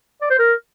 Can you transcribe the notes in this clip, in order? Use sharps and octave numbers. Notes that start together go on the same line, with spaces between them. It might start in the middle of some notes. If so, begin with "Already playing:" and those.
D5
C5
A#4